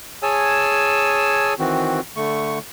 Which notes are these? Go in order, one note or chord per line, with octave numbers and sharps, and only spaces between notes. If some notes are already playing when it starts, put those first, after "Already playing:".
G#4 C#5 G#5 A5 E6
D#3 E3 C4 F#4
D3 A3 C#6